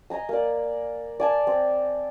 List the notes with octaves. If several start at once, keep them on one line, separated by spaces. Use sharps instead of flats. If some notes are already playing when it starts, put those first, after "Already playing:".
D#5 G#5 A#5 D#6
A#3 D5
D5 G#5 A5
C4